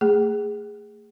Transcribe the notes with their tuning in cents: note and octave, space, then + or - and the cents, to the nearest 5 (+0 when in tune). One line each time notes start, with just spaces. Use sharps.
A3 +30 G#4 -10